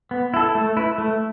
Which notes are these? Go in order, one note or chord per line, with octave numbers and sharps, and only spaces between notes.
B3
E4 A4
A3
E4 B4
A3